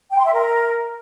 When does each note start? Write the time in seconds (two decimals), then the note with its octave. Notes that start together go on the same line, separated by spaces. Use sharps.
0.11 G5
0.18 C6
0.26 E5
0.33 A#4